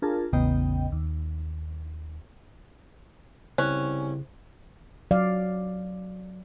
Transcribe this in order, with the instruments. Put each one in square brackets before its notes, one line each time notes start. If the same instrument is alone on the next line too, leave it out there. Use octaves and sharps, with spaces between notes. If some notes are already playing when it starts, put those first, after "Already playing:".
[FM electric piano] D4 F4 G#4 A#4 A5
A1 E2 C#3 B3 D#5 G5
D#2
[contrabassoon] C2 [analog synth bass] C#3 [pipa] C#4 [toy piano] C5
[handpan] F#3 D5 F5